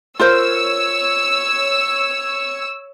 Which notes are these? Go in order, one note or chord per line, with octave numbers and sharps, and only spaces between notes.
F4 A#4 C5 C#5 E6